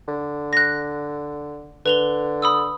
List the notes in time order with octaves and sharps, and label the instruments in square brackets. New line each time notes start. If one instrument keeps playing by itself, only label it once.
[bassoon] D3
[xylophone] F#6 A#6
[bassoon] D3 [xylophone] B4 F7 G7
[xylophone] B5 D#6 E6